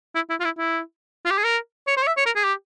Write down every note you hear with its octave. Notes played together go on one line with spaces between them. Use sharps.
E4
E4
F4
E4
E4
F4
G4
G#4
A#4
C#5
C5
C#5
E5
C#5
A#4
G#4
G4